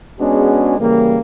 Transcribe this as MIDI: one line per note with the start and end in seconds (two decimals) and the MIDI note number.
0.20 0.75 56
0.20 0.75 59
0.20 0.75 61
0.20 0.75 62
0.20 0.75 66
0.20 0.75 68
0.80 1.18 49
0.80 1.18 52
0.80 1.18 55
0.80 1.18 58